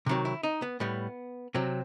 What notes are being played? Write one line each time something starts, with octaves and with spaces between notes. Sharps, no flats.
C3 D#3 F#3
E4
D#4
B3
A2 G3 B3
C3 F#3 C4